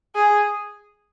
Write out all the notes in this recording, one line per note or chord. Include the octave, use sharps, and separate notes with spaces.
G#4